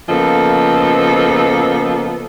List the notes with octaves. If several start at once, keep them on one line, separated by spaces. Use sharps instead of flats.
C#3 F3 A#3 B3 A4 D#5